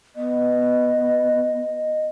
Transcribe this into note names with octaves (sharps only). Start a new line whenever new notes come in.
B3 D#5